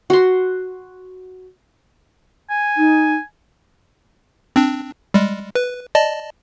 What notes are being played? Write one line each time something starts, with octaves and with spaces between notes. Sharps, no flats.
F#4 C6
G#5
D#4
C4 D4
G3 G#3
B4
D5 D#5 A5